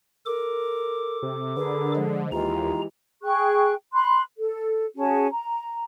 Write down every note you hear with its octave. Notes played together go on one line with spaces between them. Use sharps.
A4 A#4 D6
C3
D3 G#4 A#4 B4
F3 G#3
D#2 E3 G#3 F4 G4 A#5
G#4 G5 C#6 F#6
B5 C6 F#6
A4
C#4 F#4 G#4 A5
A#5